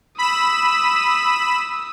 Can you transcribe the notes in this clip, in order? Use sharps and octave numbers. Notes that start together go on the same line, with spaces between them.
B5 D#6 E6 E7